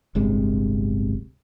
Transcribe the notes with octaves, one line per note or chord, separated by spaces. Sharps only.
D1 G1 C3 G#3